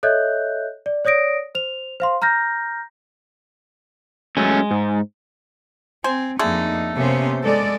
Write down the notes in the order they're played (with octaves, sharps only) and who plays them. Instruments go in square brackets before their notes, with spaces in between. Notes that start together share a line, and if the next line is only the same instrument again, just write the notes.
[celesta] A4 C#5 D#5 E5 F#6 G6
D5
C#5 D5 D#6 A#6 D7
C5 F7
C5 F5 C6
A#5 F6 G6 A#6
[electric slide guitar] F#3 A3 C#4 [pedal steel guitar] G#3
[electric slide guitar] G#2
[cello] C4 [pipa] C5 G#5
[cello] F2 A#3 [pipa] D3 A3 G#4 [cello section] D#4
[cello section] C3 A#3 C5 [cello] B3 C#4
[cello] G#3 [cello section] A4 D5